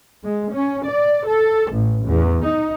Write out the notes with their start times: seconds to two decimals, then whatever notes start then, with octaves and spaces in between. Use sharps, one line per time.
0.24 G#3
0.53 C#4
0.88 D5
1.27 A4
1.72 A1
2.05 E2
2.45 D#4